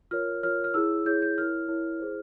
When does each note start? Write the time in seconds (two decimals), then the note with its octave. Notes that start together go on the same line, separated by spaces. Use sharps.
0.11 F4 A#4 C#5 F6
0.43 F4 A#4 C#5 F6
0.64 F6
0.74 E4 G#4 C#5 E6
1.05 E4 G#4 C#5 G6
1.22 G6
1.38 E4 A#4 C#5 F6
1.68 E4 A#4 C#5
2.00 E4 G#4 C5